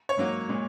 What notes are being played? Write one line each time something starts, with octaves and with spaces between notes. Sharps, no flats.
C#5
G#2 F#3 A#3
A#2 G#3